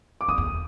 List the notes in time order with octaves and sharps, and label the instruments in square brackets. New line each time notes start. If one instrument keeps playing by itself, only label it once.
[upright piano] D6
[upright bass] F2 [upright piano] D#6
[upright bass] E2